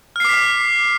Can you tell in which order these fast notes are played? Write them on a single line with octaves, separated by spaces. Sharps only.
F6 C7 D6 B6